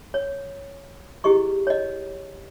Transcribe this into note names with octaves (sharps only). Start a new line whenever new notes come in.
C#5
E4 G4 G#4 D#5 C#6
C#5 D#5